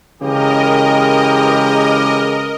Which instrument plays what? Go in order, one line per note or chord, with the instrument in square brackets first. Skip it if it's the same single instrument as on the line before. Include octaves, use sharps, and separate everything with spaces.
[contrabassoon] C#3 [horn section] E3 G#3 G4 [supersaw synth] A#4 D#5